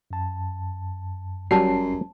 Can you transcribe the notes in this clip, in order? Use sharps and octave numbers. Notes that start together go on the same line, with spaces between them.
F#2 A5
G1 F#2 F#3 G3 C#4 A5 B5 C7